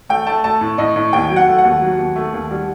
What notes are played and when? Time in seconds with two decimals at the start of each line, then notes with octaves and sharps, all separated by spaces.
0.09 A3 G5
0.27 A3 A5
0.44 A3 A5
0.61 A2
0.78 A2 D#5
0.96 A2
1.13 D#2 G5
1.30 F#3
1.36 F#5
1.48 A3
1.58 F#5
1.65 D#2
1.81 F#3
1.99 D#2
2.16 A3
2.34 D#2
2.51 G3